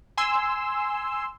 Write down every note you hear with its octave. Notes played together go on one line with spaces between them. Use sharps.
G#5 C6 E6